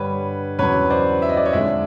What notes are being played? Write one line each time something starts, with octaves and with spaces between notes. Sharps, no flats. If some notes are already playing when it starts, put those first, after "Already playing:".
Already playing: G2 D3 G3 B4 C#5
E2 C#3 F#3 B4 C#5
C5 D5
E5
D#5
D5
C#5 D#5
F2 D3 F3 G#3 D5 E5